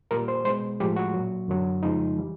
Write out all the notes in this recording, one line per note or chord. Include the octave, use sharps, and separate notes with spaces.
A#2 G3 A#4
C5
B2 G#3 C5
A2 F3 G#3 G4
F#4
A#2 F#3
F#2 D3 F#3
F2 C#3 F3 G#3 D#4
E3 G3